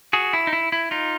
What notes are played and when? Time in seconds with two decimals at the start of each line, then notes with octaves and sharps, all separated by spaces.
0.13 F#4 G#4
0.33 E4
0.47 D#4
0.53 E4
0.72 E4
0.91 D#4 F4